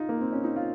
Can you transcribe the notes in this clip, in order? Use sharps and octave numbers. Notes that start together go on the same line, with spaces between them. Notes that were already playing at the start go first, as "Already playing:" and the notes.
Already playing: D#4 F4
A#3
C4
C#4
D#4
F4